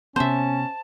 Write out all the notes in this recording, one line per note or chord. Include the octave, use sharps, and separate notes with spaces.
C3 B3 C#4 C5 E5 A5